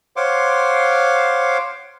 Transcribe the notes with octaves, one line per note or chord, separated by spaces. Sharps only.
C5 C#5 F5 F#5 C6 D6